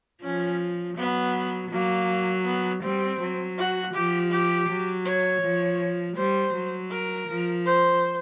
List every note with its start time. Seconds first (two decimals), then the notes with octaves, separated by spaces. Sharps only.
0.23 F3 C#4
0.97 F#3 B3
1.71 F#3 A#3
2.45 B3
2.83 G3 C4
3.20 F#3
3.58 F#4
3.94 F3 G4
4.31 G4
4.68 F#3
5.05 C#5
5.42 F3
6.17 G3 C5
6.54 F#3
6.91 A#4
7.28 F3
7.66 C5